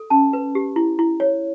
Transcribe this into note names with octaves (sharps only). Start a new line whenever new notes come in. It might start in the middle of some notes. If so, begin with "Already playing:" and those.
Already playing: A4
C#4 A5
B4
G4
E4
E4
C#5